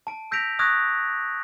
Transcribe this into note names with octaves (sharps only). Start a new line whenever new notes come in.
A5 D7
E6 G6 A#6 B6 D7 F7
C#6 D#6 F6 F#6 G#6 A#6